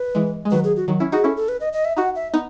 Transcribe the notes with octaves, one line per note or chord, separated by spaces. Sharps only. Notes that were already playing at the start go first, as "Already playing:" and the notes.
Already playing: B4
E3 G#3
G#3
D#3 F#3 B4
G#4
F#4
D#3 F#3
C#4 E4
D#4 F#4 G#4
C#4 E4 A4
A4
B4
D#5
D#5
E5
D#4 F#4 F#5
E5
B3 D#4